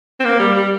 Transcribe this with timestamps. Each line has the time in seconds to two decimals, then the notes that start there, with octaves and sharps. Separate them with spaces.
0.20 C4
0.25 A#3
0.39 G3
0.56 G3